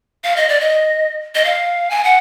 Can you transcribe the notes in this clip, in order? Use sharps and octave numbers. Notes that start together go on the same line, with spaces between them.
F5
D#5
D5
D#5
D#5
F5
G#5
F#5